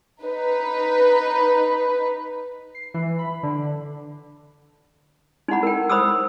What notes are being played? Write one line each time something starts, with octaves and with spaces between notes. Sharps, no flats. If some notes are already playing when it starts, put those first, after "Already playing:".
D#4 B4
C7
E3
B5
D3
D#4 E4 F#5 B5
A#4 G5
C5 B5 D#6 E6